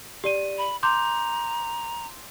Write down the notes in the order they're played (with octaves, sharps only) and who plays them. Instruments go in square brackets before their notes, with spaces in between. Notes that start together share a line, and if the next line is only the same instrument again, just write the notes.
[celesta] G4 D5 D#7
[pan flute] B5
[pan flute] A#5 [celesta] C6 D6 G6